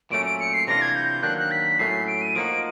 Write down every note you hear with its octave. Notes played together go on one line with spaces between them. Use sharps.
A#2 F#3 A3 C#4 D7
D7
C#7
C7
C3 E3 A3 D4 F4 A#6
G#6
G6
D#3 F#3 A#3 D4 F#6
F#6
B6
A2 F#3 A3 C#4 C7
D7
D#7
F3 A#3 D#4 F#4 D7